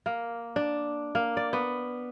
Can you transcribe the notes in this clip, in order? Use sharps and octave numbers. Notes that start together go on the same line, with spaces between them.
A#3
D4
A#3
D5
B3